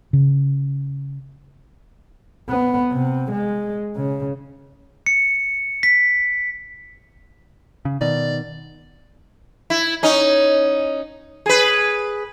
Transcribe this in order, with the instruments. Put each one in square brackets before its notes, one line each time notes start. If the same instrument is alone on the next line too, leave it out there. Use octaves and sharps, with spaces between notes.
[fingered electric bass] C#3
[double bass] B3
C3
G#3
C#3
[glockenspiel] C#7
B6
[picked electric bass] C#3
[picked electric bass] B2 D#3 [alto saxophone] D5
[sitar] E4
C#4 D#4
G#4 B4